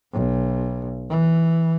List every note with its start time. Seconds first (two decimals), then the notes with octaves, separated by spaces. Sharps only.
0.13 B1
1.10 E3